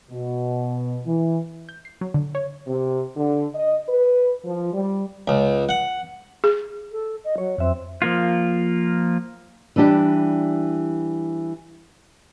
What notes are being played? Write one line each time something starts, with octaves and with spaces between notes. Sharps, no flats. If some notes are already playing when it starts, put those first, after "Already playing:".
B2
E3
G6
C7
F#3
D3
C#5
C3
D3
D#5
B4
F3
G3
C#2
F#5
G#4
A4
D#5
F#3 C#5
F2 C4 E5
F3 A#3 F4
E3 G3 D4 G4